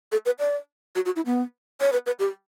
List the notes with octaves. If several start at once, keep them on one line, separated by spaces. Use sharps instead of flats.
A4
B4
D5
F#4
F#4
E4
B3
C#5
B4
B4
G4